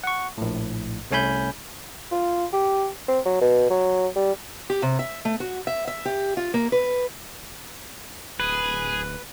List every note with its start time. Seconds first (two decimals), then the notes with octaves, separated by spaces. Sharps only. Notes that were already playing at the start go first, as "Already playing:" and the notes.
0.04 F#5 C#6
0.38 A#1 A2
1.11 C2 A3 C#4 G#5 B5 G6
2.12 F4
2.53 G4
3.08 C4
3.25 F#3
3.41 B2
3.70 F#3
4.15 G3
4.70 G4
4.82 C3
4.99 E5
5.25 A3
5.40 F#4
5.67 E5
5.87 E5
6.05 G4
6.37 F4
6.54 A#3
6.72 B4
8.40 D1 G#4 B4